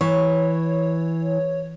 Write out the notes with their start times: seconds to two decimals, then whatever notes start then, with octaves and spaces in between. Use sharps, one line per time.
0.01 E3 C#5